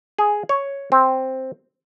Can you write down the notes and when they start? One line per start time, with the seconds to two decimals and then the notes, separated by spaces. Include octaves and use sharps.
0.19 G#4
0.49 C#5
0.92 C4